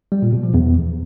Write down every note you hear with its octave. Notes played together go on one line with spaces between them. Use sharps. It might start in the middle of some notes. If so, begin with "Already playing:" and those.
G3
A#2
B2
F3
E2